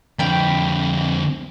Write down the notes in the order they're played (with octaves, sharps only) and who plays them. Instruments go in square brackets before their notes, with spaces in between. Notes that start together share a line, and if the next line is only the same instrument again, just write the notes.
[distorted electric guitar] F2 D3 [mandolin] F5 G5 B5